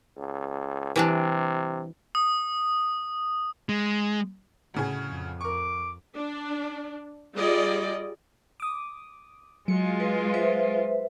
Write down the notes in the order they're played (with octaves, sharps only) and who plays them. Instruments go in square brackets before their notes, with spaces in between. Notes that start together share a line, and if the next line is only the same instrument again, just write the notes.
[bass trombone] C#2
[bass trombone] C3 [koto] E3 G3 D4
[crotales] D#6
[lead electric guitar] G#3
[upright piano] D2 C#3 G#4 [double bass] A2
[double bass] F2
[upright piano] A#4 C#6 [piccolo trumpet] D6
[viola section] D4
G3 F4 G#4 D5 D#5
[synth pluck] D6 D#6
[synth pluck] F#3 C#7 [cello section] G#3 F4
[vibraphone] B4
B4 C5 E5